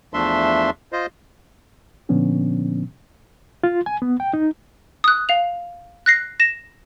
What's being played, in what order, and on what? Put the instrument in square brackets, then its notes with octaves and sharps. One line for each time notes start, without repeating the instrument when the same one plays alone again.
[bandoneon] E2 F3 A3 D4 E5 C6
F4 C5 D#5
[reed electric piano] A#2 D3 F3 B3 C#4 D4
F4
G#5
B3
G5
D#4
[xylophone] D#6 F#6
F5 F7
F#6 A#6 C7
A#6 E7